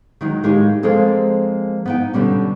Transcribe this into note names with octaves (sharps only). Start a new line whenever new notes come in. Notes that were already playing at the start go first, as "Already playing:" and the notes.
D#3 F#3 G#3 D#4
A2 G#3 A#3 D#4 G4 G#4
F3 G#3 A#3 C4 G#4 A4
B3 D#4 G5
B2 D3 G3 C#4